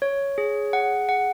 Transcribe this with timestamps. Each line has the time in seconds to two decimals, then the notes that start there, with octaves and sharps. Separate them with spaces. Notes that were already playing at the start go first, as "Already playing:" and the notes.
0.02 C#5
0.38 G#4
0.73 F#5
1.09 F#5